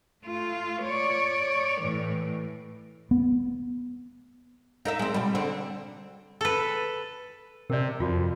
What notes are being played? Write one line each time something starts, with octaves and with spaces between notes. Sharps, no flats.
A3 F4
C#5 D5
A2 E3
B3
D#4 A#4 E5
G#3 C4
B2 G3
D3 C4
A4 B4
C3 A#4 D5
F2 F4 F#4